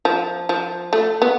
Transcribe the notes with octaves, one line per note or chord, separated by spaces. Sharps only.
F3
F3
A3
B3